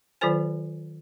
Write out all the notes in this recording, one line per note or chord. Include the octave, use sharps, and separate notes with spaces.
D#3 F#3 F4 A4 C5 G#5